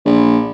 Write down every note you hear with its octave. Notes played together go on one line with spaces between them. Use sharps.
A#1